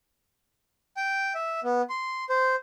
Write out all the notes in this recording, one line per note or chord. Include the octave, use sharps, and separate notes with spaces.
G5
E5
B3
C6
C5